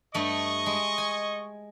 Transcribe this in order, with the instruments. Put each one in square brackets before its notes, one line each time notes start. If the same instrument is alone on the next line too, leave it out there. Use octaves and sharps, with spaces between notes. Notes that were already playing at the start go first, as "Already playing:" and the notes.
[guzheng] G2 A3 [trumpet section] D#5 C#6
[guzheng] G#3
G#5